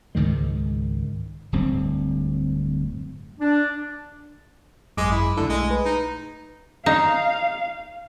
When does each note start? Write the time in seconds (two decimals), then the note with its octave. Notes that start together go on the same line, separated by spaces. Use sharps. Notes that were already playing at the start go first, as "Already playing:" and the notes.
0.15 C#2 G#2 D#3 G#3
1.52 D1 G2 C4
3.40 D4
4.97 G#1 F#2 G#3 D6
5.12 E4
5.37 B1 D3 A3 E4
5.50 G#3
5.71 B4
5.85 D#4
6.86 D#4 F5